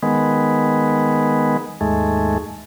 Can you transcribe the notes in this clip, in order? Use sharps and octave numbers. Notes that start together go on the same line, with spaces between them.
D#3 G#3 B3
D#2 G#2 G#3 A3